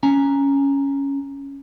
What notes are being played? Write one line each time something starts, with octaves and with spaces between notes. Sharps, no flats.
C#4 G#5 A#5